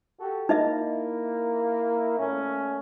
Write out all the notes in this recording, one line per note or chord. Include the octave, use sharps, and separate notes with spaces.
F#4 G4 A4
A#3 D#4 E4 D#5 E5
A#2 A3 C#4